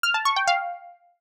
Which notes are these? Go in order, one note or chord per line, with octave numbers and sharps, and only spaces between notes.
F6
A5
C#6
G5
F5